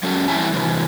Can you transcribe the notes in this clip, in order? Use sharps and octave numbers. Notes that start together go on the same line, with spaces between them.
F#3 C#4 A4
E3 G3 C4 E5 G#5 A5
A2 C3 E3